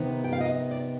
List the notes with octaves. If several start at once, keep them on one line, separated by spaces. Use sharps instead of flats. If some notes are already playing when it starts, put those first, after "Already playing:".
Already playing: C3 D#3 B3 D#4
G5
F5
D#5
D5